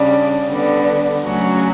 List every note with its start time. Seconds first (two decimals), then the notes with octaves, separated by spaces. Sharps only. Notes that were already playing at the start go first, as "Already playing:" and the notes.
Already playing: C#3 G3 D4
0.50 D3 G3 B3
1.23 D2 C#3 F#3 C#4 F#4